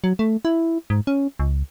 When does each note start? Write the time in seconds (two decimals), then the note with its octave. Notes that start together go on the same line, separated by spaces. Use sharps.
0.04 F#3
0.19 A3
0.45 E4
0.90 G#2
1.07 C#4
1.39 C#2